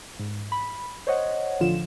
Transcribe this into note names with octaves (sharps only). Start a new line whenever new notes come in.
G#2
B5
C5 C#5 D#5 F#5
A1 D3 F3 F4 E7